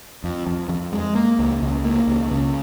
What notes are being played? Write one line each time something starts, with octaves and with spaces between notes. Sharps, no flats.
F2
F2
F2
G#3
A#3
C#2
C#2
A#3
C#2
C#3